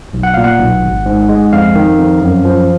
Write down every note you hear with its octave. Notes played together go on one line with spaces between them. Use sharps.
B1
F#5
A#2 F5
F#5
B1
G#1
G#2
G#3
F2 F5
D#3
F2
F#2
F3